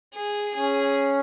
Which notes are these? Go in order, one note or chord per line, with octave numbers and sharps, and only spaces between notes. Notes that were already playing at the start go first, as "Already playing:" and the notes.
G#4
C#4 G#4